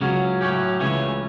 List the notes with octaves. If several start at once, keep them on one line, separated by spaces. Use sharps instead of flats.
C#2 C#3 F#3 C#4
A2 F#3 C#4 G4
C#2 C#3 E3 A3 C#4